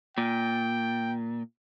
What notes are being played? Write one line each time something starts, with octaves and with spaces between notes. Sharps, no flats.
A#2 G5